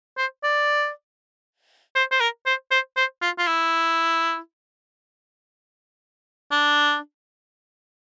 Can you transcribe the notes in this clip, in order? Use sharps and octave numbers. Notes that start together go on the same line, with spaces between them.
C5
D5
C5
C5
A#4
C5
C5
C5
F4
F4
E4
D4